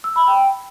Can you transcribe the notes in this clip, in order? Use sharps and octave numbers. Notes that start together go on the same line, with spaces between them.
E6
B5
G5